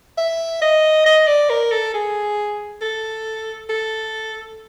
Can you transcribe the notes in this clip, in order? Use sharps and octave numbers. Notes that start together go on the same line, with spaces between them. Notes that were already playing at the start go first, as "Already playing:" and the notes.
E5
D#5
D#5
D5
A#4
A4
G#4
A4
A4